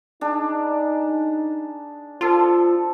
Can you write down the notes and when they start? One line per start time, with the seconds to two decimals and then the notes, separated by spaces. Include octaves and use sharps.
0.21 D4 D#4 G#4
2.21 F3 F4 A4 C5